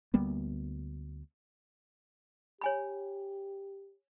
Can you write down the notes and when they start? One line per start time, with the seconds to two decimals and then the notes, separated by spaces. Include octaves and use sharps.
0.14 D2 G3 A#3 B3
2.61 G4 C#5 G#5 B5